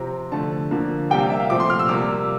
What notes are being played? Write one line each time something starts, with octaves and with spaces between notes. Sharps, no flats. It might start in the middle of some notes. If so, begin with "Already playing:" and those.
Already playing: C3 F3 C4 A#5
D3 F3 A3 A5
D3 F3 A#3
C3 G3 A#3 G5
F5
E5
F5
A#2 F3 A3 C4 D6
C6
F6
E6
C3 G3 A#3 D6